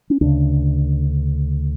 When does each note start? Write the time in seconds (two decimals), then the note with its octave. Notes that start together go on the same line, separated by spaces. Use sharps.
0.10 C#4
0.21 D2 C#3 D4